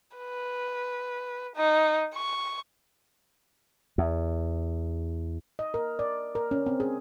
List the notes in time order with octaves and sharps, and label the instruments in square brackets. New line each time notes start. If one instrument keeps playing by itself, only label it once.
[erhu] B4
D#4
C#6
[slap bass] E2
[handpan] D#5
A#4
D5
A#4
C#4
C4
G#4